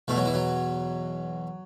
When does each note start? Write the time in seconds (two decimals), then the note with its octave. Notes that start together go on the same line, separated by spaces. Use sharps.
0.08 E2 B2 A3
0.16 F#3
0.26 E3
0.34 F#3